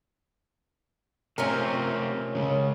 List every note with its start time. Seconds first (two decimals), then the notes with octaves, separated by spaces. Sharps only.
1.38 C3 A3 C4 C#4 F4 A#4
2.35 C#3 G#3